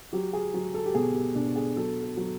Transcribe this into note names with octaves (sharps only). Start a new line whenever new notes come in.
F#3 G4
G#4
F#3
A4
G4
B2 G#4
G4
B2 D4
G#4
F#3 A4
A4
F#3